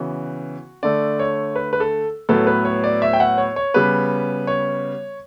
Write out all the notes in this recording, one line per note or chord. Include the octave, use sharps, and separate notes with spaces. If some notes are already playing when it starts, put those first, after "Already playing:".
Already playing: C#3 E3 B3 F#4
D3 A3 D5
C#5
B4
B4
A4
A2 F#3 B3 A4
B4
C#5
D5
E5
G5
F#5
C#5
C#5
C#3 G3 B3 B4
C#5